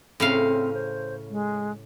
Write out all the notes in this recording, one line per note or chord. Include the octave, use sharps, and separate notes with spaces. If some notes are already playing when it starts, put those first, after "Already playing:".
A2 C#3 C4 F5
C5
G#3